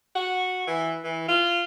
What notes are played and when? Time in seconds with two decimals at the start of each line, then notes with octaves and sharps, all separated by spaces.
0.15 F#4
0.67 E3
1.04 E3
1.28 F4